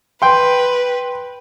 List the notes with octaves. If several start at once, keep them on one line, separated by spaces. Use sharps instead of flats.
B4 G5 C6